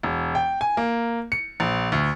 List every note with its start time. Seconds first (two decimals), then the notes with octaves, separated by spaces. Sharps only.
0.03 E1
0.35 G5
0.61 G#5
0.77 A#3
1.32 C#7
1.60 A#1
1.92 D2